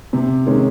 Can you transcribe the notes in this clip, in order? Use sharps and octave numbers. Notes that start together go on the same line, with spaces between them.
C3
D#3 G#3 C#4